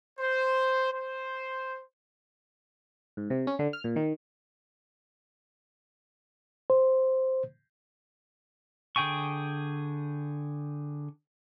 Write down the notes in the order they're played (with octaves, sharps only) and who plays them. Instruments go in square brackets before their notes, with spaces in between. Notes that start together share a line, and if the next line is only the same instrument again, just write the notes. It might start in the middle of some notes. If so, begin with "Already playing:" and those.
[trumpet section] C5
C5
[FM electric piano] G#2
C3
C#4
D3
F6
A#2
D#3
[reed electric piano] C5
[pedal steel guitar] D3 G#4 G5 G#5 C#6